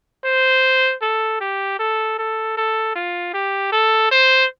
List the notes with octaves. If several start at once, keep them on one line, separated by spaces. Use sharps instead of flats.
C5
A4
G4
A4
A4
A4
F4
G4
A4
C5